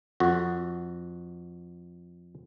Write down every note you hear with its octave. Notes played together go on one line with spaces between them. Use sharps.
F2 F#4